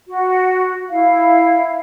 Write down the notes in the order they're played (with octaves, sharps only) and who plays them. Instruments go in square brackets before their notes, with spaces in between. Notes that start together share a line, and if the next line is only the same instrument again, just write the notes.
[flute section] F#4
E4 F5